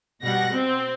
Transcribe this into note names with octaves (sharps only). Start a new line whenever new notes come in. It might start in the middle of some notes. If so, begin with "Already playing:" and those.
B2 G3 F#5 A#6
C4